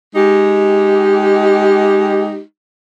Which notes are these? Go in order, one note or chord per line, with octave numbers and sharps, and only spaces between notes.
G#3 D#4 G4